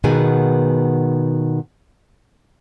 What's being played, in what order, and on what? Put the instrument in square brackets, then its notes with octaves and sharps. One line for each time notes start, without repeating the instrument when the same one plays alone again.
[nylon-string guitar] B2 D#3 B3 G#4 G#5